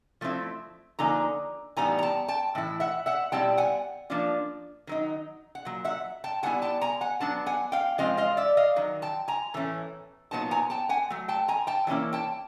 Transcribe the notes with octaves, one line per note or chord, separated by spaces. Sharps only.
F3 A3 C4 E4
D3 F3 A#3 D#4 G#5 A#5
A2 E3 G3 B3 D#4 G#5 A#5
A#5
G5 A5
G5 A5
A2 E3 E4
E5 F#5
E5 F#5
B2 G3 C4 E4 G5 A5
F#5 G#5
F3 A#3 D4 F4
D#3 F#3 D#4
F#5
A#2 F#3
E5 F#5
G5 A5
B2 G3 B3 E4 F#5 G#5
G5 A5
G#5 A#5
F#5 G#5
F#3 B3 D4 A5
F#5 G#5
F5 G5
F3 G#3 C4 F4 D#5 F5
D#5 F5
D5 E5
D#5 F5
D#3 F#3
G5 A5
G#5 A#5
A2 E3 A3 C#4
A#2 F#3 B3 D#4 A5
G#5 A#5
G5 A5
F#5 G#5
F#3 A3
G5 A5
G#5 A#5
G5 A5
E3 G3 A#3 C#4 E4
G5 A5